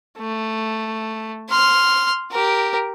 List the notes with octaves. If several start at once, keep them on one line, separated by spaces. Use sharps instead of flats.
A3
C6 F6
G4 A#4